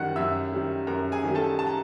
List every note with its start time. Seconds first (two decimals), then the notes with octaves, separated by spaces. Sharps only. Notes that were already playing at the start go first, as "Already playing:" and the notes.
Already playing: F#2 D#3 G3 F#5 F#6
0.16 F#2 E5 E6
0.52 D#3 G3
0.87 F#2 A#4 A#5
1.12 G#4 G#5
1.23 D#3 G3
1.35 A4 A5
1.59 A5
1.67 A#5